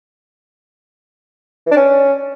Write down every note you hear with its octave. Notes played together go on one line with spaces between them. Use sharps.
E3
D4
C#4